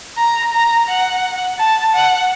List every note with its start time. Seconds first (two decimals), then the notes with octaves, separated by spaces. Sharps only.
0.17 A#5
0.53 A#5
0.88 F#5
1.59 A5
1.94 F#5